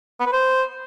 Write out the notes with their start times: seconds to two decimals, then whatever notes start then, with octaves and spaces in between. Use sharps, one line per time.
0.20 B3
0.26 B4
0.32 C5